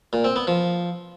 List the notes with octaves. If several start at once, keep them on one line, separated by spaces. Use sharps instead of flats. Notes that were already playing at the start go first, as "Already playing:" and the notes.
A#2
C4
B3
F3